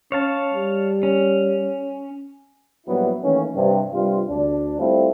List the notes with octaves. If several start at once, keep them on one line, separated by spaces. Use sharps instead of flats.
C#4 C#5 F5 A5
G3
C#4
A#1 F#3 G3 B3 E4
D#3 E3 A3 A#3 C#4
G2 C3
G2 C3 G3 F4
D2 D4
G3 A3 C4 E4 F4 A4